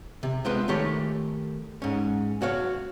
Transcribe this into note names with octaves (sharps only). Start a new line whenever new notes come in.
C3
G#3 B3 C4 F4 B4 C5
D#3 A3 G4 C#5
G#2 C#4
F#4 C#5 F5